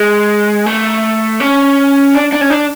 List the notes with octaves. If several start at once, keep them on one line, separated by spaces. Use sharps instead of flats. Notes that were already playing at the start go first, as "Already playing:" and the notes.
Already playing: G#3
A3
C#4
D4
D4
C#4
D4